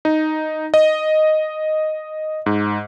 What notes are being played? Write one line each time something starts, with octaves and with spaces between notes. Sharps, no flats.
D#4
D#5
G#2